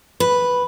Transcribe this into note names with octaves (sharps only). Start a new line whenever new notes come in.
B4